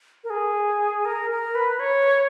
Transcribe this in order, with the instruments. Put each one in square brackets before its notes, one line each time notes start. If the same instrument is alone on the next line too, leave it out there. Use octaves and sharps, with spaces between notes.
[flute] A#4
G#4
A#4
A#4
B4
C#5